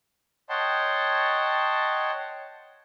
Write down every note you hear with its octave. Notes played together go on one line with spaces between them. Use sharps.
C#5 D#5 F#5 G5 A5 C6